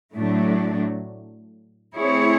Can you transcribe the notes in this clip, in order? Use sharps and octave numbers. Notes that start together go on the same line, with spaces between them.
A2 F#3 A3 D4
A3 C4 E4 G#4 C#5